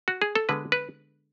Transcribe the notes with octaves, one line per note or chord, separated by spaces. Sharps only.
F#4
G#4
A4
D3 G#3 B3 B4
B4